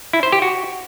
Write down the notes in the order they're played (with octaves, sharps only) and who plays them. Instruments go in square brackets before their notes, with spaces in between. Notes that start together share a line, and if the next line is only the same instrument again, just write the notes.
[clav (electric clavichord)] E4
C5
G4
F#4